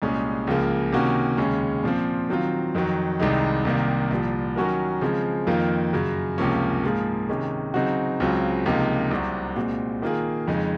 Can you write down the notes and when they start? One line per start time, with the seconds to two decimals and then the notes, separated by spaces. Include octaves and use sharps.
0.02 C2 A#2 G#3 C#4 G#4
0.47 C#2 C#3 F3 A#3
0.92 C3 D#3 A#3 C#4 F#4
1.37 D#2 C#3 G#3 C#4
1.83 A#2 F3 C4
2.29 D#3 F#3 C4 F4
2.75 F2 D#3 F#3
3.20 C2 C3 D#3 G#3 D#4
3.65 C2 C3 D#3 A#3
4.11 C2 A#2 F3
4.56 D#3 F#3 C#4 F#4 A#4
5.01 C#3 F3 G#3 C4
5.47 F2 D#3 A#3 F4
5.93 F#2 C#3 F#3
6.38 C#2 C3 F3 A#3 C#4
6.84 G#2 F3 A#3 F4 G#4
7.29 C3 D#3 G#3 C#4
7.74 C#3 F#3 C4 D#4 F#4
8.20 C#2 C#3 F#3 C4 F4
8.66 C#2 C3 F3 A#3 D#4
9.11 C2 C3 F#3 C4 F#4
9.56 A#2 G#3 C4 F#4
10.02 D#3 A#3 F4 G#4
10.48 F2 C#3 G#3 D#4